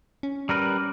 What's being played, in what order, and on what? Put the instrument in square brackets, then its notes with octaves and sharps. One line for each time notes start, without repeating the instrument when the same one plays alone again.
[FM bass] C#4
[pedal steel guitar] G3 A#4 B4